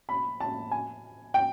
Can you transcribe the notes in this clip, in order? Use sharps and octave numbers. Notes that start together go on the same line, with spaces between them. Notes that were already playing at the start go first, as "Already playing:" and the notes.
B5
A5
G#5
G5